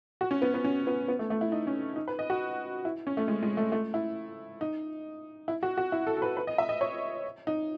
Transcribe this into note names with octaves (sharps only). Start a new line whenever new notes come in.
F#4
C#4
B3
B3
C#4
B3
B3
A3
A3
E4
D#4
C#4
D#4
B4
D#5
F#4
E4
C#4
A3
G#3
G#3
A3
A3
E4
D#4
E4
F#4
F#4
E4
A4
A4
B4
B4
D#5
E5
D#5
C#5
D#4